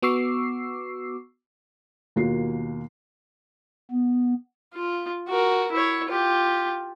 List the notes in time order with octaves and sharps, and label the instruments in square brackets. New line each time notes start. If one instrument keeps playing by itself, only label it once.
[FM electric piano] B3 F#4 C#6 D6 E6 C7
[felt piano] D#2 B2 A#3 F4 F#4 C7
[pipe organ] B3
[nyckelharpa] F4
F#4 A#4
E4 C#5
F4 G4